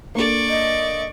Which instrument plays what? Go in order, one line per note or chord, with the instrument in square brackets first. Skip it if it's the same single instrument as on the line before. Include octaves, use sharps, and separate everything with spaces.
[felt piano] A#3 D4 A4 [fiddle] D5 C#6
[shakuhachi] D#5